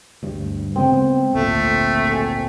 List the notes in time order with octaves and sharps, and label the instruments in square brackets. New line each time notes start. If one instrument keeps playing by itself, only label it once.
[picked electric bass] D2 G2
[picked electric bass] C#3 G#3 B3 [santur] C4
[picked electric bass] G#1 D2 A#2 [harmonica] A3
[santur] G#5